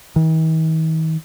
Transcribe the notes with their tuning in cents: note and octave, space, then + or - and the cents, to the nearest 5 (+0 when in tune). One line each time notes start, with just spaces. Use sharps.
D#3 +45